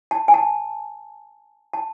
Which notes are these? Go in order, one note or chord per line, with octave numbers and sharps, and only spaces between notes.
A5
G#5
A5
A5